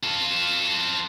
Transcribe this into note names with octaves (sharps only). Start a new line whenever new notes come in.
F4 A4